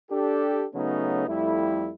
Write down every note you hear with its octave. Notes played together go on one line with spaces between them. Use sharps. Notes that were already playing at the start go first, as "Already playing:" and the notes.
D4 G4 A4
C#3 F#3 A3 B3 C#4 D#4
F2 G3 A3 E4